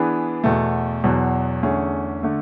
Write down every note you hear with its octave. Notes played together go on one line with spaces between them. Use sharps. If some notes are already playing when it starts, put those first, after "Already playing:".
Already playing: E3 B3 D4 G#4 B4
E2 B2 A3
E2 B2 F#3
E2 D3 A3 C#4 G#4
D3 A3